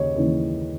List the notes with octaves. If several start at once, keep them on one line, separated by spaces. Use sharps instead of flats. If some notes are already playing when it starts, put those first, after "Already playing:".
Already playing: D#2 C#3 C#5 D#5
D#2 C#3 E3